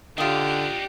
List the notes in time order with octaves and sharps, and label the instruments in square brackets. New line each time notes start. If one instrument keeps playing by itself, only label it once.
[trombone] D3 [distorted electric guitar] D4 D#4 [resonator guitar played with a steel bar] F4 D#5 [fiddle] G4